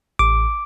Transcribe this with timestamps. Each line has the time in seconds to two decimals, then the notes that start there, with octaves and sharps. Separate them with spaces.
0.19 A1 D6